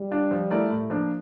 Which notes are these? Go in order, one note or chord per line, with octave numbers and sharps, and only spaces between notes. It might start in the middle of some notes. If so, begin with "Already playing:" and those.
Already playing: G3
D4 F4
F3
A3 E4 A#4 D5
A2
F3 A#3 D4